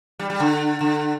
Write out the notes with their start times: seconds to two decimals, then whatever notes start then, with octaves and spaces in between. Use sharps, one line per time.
0.19 G3
0.30 G3
0.40 D3
0.81 D3